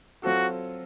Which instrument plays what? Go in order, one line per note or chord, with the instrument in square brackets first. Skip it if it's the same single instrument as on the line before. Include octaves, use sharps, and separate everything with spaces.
[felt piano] F#3 C4 F4 A4 [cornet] F#4